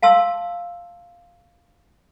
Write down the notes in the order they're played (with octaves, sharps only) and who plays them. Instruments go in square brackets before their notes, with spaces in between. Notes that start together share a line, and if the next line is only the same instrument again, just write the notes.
[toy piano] F5 A5 C6 E6